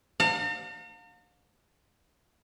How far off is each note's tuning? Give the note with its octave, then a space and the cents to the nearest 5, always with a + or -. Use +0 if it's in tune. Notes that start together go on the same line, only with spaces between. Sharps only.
F5 +35 A#5 -45